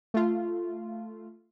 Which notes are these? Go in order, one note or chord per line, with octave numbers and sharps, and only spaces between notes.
A3 F4